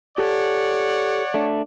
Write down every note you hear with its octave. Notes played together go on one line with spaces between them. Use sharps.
G4 A4 C#5 D5 F#5
A3 D4